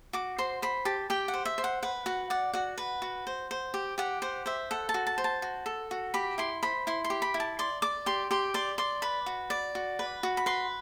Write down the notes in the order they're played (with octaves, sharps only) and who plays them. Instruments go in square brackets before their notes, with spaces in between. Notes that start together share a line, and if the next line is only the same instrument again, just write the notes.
[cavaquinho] F#4 D6
C5 C6
C5 B5
G4 A5
G4 G5
F#5
C5
E5
C5
F#5
B4 F#5
F#4 F#5
D5 F#5
F#4 F#5
B4
F#4
C5
C5
G4
G4 F#5
C5 F#5
C5 E5
A4 F#5
A5
F#4
A5
C5
A5
F#4
A4
F#4
G4 B5
E4 C6
C5 B5
E4 C6
C6
G4
B5
E4
A5
D5 C6
D5 D6
G4 C6
G4 C6
D5 C6
D5 C6
B4 B5
F#4
D5
F#4
B4
F#4
B5
B4 C6